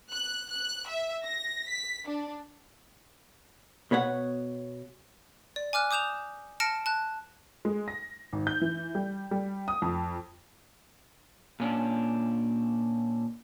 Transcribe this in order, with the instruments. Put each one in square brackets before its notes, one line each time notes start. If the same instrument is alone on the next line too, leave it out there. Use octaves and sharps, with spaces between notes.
[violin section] F#6
F#6
E5
A#6
B6
D4
[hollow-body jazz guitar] B2 B4 C#5 F#5
[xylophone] D5
G#5 D6 F6 F#6
D6 D#6 G6 E7 F7
A5 F6 A#6 C#7 D7 E7
A5 F#6
[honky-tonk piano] G#3
A#6
G#1
G6
E3
G3
G3
D#6
F2
[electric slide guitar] A#2 C#4 D4